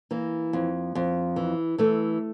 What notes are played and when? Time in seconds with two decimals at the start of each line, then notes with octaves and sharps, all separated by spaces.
0.11 E3 A#3
0.53 F2
0.95 F2
1.36 E3
1.78 E3 A3